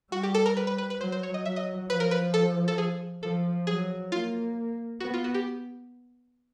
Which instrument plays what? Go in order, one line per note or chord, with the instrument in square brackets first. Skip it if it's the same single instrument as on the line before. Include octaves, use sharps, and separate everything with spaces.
[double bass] G3 [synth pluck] F#4
[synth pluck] G4
A4
A#4
B4
B4
B4
B4
[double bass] F#3 [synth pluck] C5
[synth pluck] C5
C#5
D#5
[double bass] F#3 [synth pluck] E5
[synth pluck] D#5
[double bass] F3 [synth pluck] B4
[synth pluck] A#4
B4
A4
A4
G#4
[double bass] F3 [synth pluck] A4
[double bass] F#3 [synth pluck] G#4
[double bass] A#3 [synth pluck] F4
[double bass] B3 [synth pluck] F#4
[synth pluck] F4
F#4
G4